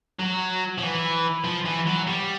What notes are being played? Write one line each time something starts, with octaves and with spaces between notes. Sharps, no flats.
F#3
F3
E3
F3
E3
F#3
G3